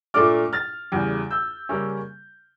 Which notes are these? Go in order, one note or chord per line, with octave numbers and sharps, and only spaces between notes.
A#2 A3 D4 D6 F6
F6 A6
E2 C#3 G3
E6 G6
C#3 G3 A#3 C#4